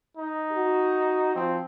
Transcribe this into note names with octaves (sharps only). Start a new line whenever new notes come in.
D#4
F#4
F3 C4